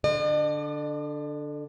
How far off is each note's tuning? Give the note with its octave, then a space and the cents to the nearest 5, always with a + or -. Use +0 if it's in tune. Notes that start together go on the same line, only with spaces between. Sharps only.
D3 +0 D5 +45